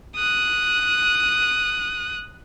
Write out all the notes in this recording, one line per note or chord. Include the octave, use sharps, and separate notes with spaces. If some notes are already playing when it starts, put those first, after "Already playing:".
D#6 F#6